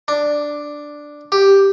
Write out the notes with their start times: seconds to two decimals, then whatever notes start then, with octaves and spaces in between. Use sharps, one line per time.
0.08 D4
1.32 G4